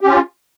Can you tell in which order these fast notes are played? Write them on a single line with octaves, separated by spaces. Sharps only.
G4 C#4 F4